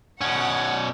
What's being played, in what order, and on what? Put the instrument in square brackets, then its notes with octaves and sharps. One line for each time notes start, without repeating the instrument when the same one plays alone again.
[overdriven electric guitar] B2 C#4 [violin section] F#5